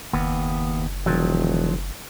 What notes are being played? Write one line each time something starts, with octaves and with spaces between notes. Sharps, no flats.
F#1 D#2 B3
E1 D#3 F3 F#3